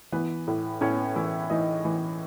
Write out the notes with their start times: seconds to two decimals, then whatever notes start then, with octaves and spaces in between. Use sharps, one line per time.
0.12 E3 B3 B4
0.47 A2
0.81 A2 C#4 C#5
1.16 E3 E4 E5
1.50 E3 D#4 D#5
1.85 E3